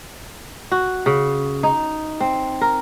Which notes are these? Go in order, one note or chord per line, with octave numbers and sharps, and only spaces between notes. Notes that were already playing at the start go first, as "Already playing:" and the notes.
F#4
C#3
D#4
C4
A#4